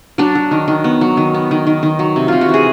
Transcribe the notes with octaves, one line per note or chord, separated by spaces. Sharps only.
F#3 D4
F#3
D#3
D#3
B3
F#3
D#3
B3
D#3
D#3
D#3
F#3
C3
C3 F4
F#4
E3 G#4